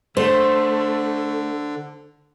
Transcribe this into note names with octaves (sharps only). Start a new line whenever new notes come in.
D3 A3 C5